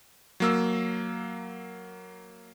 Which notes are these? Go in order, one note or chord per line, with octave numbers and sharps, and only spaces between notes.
F#3 A#3 E6